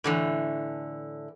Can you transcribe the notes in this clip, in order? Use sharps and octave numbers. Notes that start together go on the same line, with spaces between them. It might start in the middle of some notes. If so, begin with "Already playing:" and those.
A2 D3 E3